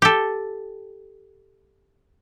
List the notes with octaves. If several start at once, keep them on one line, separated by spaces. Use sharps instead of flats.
G4 A4